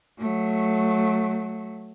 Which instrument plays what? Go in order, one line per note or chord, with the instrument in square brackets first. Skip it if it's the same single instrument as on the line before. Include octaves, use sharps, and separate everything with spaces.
[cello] F#3 A3